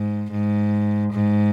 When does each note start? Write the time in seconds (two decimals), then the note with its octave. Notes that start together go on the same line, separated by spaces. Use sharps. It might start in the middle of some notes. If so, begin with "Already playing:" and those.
Already playing: G#2
0.31 G#2
1.13 G#2